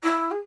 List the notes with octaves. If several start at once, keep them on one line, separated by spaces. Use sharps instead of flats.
E4
G#4